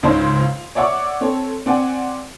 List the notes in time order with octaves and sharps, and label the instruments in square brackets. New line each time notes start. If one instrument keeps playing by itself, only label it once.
[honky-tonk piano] C#2 G#2 C#3 D#4 C5 C#5
F4
C#5 D5 E5 F#5 C#6 D6
C4 A4 C#5
C4 D5 F#5 G#5